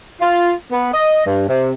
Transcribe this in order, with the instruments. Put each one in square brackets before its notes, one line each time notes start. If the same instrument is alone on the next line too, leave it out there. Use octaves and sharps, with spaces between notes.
[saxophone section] F4
B3
D#5
G2
C3